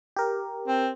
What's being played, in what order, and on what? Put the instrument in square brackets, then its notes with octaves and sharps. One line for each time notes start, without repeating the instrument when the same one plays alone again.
[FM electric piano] G4 A#4
[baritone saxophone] C4